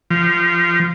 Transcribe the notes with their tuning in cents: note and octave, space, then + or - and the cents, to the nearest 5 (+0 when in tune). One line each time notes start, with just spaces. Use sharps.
F3 -20